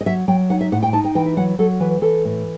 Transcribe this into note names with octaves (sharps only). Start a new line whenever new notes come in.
D#5
F#3 E5
F#3 G5
D#4 F#5
E5
A2 F#5
G5
D#4 A5
G5
E3 G5
E5
F#3 F#5
F#3 A4
E3 B4
E3 A4
A2